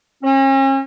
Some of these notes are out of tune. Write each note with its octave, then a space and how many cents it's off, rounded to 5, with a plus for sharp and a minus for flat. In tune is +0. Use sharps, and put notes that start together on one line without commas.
C#4 -40